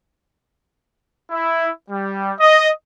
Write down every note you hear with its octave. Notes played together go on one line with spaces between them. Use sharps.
E4
G3
D#5